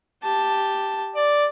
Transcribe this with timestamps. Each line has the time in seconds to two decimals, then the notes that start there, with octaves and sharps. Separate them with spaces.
0.23 G4 A5
1.15 D5